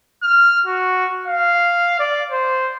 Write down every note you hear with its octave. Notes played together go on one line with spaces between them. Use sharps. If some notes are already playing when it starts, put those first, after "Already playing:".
F6
F#4
F5
D5
C5